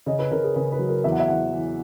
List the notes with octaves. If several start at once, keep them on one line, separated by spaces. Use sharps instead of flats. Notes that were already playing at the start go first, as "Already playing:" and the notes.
C#3 D#5
B4
C#3 A#4
G#4
C#3 B4
B4
F#3
A#4
E2 E5
F#5
E5
E2 F#5
E3